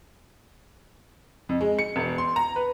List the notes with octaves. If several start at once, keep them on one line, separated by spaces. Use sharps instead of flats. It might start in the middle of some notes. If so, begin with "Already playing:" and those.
F2
G#3
C#7
E1
C6
A#5
B4